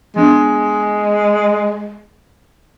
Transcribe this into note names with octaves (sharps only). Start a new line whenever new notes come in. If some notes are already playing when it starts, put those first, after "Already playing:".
F3 G#3 B3 D4